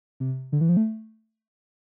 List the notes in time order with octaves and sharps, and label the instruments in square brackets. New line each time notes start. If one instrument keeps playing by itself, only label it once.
[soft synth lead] C3
D3
E3
F3
A3